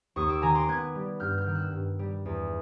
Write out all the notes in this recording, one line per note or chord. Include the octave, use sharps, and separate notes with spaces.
D#2 C#6 D#6
D6 E6
D#3 G#5 A#5
C6 D6
B3 F#6 G#6
G3
G2 F6 G6
F6 G6
D#3
E6 F#6
G2
G3
E2